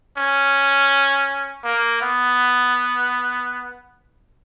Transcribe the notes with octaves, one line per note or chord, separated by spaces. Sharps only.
C#4
A#3
B3